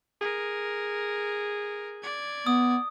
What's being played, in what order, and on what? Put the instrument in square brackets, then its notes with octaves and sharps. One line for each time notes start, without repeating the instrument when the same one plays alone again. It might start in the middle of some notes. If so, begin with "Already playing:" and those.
[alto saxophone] G#4 [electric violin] A#4
[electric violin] D5 G#6
[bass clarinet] B3 [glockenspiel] D#6